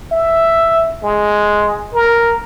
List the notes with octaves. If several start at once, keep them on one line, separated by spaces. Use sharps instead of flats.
E5
G#3
A#4